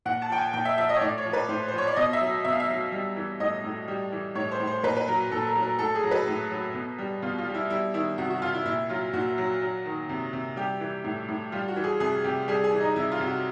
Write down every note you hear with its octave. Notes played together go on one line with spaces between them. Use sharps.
A#2 F#5
A5
F3 G5
G#5
A#2 G5
E5
F3 E5
D#5
C#5
A2 D5
C#5
F3
B4
A2 C5
C5
F3
C#5
D5
B2 D#5
E5
F#3
B2 E5
F5
E5
F#3
G3
E3
A2 D#5
A2
G3
E3
A2 C#5
C5
A2
C5
A#2 B4
B4
F#3 A#4
A#2 A4
A#4
F#3
A#4
A2 A4
G#4
F#3
B4
A2
F#3
B2
G3
B2 F4
F4
G3
E4
G3 E4
D#3 E4
C3 F#4
F#4
C3 F4
E4
A#2 E4
F#3 F4
A#2 F#4
F#3
F#3
D#3
C3
C3
G3 G4
E3
A2
A2
G3 F4
F#4
E3
G#4
C3 G#4
C3 G4
G3 G#4
G#4
E3
D#4
C3 E4
F4
C3
F#4